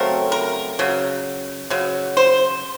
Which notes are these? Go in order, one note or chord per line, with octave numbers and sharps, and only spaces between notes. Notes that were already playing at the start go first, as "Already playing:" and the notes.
Already playing: C#3 F#3 A3 C4 A#4
A#4
C#3 F#3
C#3 F#3
C5